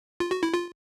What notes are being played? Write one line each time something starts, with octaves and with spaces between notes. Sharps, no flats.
F4
F#4
E4
F4